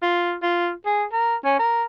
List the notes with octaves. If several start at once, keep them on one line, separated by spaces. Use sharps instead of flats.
F4
F4
G#4
A#4
C#4
A#4